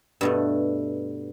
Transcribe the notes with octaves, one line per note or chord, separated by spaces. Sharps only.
G2 B2 A3